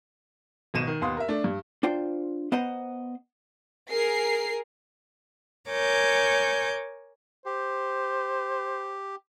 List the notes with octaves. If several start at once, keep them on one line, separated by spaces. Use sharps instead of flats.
G#1 B2 D#7 E7
D#3
D#2 B3 F5 C6 D#6
A#4 E5
A3 D4
G2
D4 F4 C5 G5
B3 B4 C5 D#5 F#5 A#5
G#4 A#4 C7
A#4 C#5 G#5 D6 G6
G4 C5